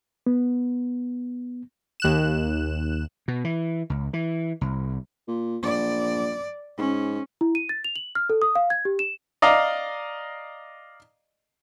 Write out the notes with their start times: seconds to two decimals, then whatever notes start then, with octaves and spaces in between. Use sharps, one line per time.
0.27 B3
2.00 D#2 F#6 E7
3.28 B2
3.44 E3
3.90 C#2
4.13 E3
4.61 C2
5.28 A#2
5.63 A#1 D5
6.78 G#2 C#4
7.41 E4
7.55 D#7
7.69 A6
7.84 F7
7.96 F#7
8.15 F6
8.30 A4
8.42 D#6
8.55 F5
8.70 G#6
8.85 G4
8.99 E7
9.42 D5 D#5 F5 A#5